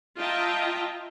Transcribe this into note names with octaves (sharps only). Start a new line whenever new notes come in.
F4 D#5 E5 G5 A5 A#5